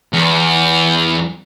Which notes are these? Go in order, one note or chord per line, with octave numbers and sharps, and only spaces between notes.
E2